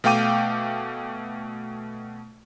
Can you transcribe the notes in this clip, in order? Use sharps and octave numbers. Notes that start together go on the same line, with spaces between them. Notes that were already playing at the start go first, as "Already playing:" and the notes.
B2 A3 F5 G5 D6 D#7